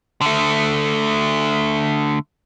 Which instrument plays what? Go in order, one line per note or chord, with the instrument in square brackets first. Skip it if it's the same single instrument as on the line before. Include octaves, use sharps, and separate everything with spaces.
[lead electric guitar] D3 A3